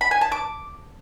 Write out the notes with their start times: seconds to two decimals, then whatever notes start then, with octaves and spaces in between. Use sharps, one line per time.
0.01 B5
0.11 G#5
0.21 A5
0.32 D6